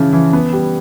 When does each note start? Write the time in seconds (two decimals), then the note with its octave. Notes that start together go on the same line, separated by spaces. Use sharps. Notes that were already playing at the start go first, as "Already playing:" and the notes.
Already playing: C#3 E3 F3
0.13 E3
0.33 B3
0.53 G3